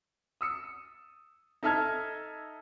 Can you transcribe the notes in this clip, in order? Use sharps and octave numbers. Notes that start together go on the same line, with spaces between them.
D#6 E6 C#7
D#4 A4 E5 A5 F6 G#6